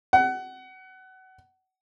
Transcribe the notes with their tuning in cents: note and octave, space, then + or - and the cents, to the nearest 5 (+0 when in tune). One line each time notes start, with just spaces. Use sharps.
F#5 +25